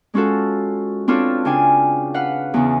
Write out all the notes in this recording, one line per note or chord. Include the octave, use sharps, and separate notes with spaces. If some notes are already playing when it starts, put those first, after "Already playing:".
G#3 C#4 F4 F#4 A4
C4 D4 F4 A4 B4 C#5
C#3 C#4 D4 G5 G#5
B4 F5 F#5
E2 C#3